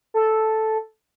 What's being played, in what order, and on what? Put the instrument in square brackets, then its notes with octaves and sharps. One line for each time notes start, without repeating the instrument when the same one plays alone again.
[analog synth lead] A4